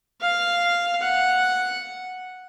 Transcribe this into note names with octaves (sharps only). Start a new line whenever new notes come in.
F5
F#5